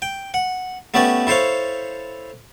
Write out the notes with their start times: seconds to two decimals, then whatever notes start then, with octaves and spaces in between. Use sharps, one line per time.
0.02 G5
0.34 F#5
0.94 A3 B3 C#4 G4 D5
1.27 E4 A4 C5 C#5 F5